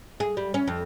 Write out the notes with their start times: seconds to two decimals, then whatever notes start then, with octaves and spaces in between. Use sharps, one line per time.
0.20 G#4
0.37 G3
0.54 C#4
0.67 F2